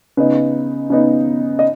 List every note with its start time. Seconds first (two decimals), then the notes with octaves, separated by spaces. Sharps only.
0.17 C#3 B3 D#4 B4
0.90 C#3 B3 D#4
1.59 D#5